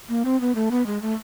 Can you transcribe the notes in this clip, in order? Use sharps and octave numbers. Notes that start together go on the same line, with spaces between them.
A#3
C4
B3
A3
B3
G#3
A3